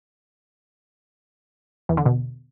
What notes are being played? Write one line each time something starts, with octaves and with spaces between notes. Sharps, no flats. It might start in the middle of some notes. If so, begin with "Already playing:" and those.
E2
D3
B2